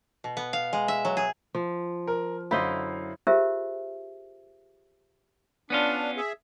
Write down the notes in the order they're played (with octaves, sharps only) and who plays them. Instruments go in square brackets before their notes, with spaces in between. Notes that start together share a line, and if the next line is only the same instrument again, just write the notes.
[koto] B2
B3
F5
G#3
E5
F#3
G#4
[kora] F3
[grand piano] A#4
[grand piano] F#2 D3 F5 [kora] E4 C5 D#5
[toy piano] F4 G4 G#4 A#4 C5 E5
[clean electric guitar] B3 C#4 F4 [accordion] D4
[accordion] G#4 E5